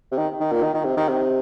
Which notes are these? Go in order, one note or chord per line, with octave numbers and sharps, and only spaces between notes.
C3
D#3
D#3
A#2
D#3
D#3
C3
D#3
C3